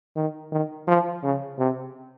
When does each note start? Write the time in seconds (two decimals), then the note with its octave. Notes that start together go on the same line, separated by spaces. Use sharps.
0.16 D#3
0.52 D#3
0.88 F3
1.23 C#3
1.59 C3